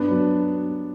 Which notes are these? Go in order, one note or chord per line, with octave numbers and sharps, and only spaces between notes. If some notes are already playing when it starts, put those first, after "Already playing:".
Already playing: G2 B3 D4
F#3